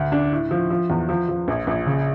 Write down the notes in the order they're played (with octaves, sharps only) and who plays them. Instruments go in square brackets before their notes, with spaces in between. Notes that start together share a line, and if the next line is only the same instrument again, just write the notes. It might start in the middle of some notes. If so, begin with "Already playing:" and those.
Already playing: [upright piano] D2
D4
A2
F3
F3
E2
F3
F3
A#1
A#1
C#3